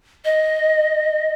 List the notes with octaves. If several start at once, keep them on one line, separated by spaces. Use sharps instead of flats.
D#5